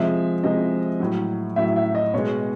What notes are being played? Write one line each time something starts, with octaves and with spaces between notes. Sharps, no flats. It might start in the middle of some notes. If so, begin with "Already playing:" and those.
Already playing: C3 F3 G#3 E5
C3 F3 G#3 D#5
A2 F#3
A2 F#3 E5
E5
D#5
B2 G#3 C#5